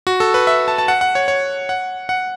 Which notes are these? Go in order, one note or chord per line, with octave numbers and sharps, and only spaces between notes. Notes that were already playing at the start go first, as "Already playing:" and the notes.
F#4
A4
B4
E5
A5
A5
F#5
F#5
C#5
C#5
F#5
F#5